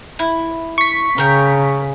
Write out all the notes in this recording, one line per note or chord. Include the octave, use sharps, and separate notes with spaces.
E4
C#6 B6
C#3 A#4 G5